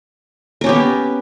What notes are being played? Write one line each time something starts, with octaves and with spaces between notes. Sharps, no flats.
B3 C#4 G4 A#4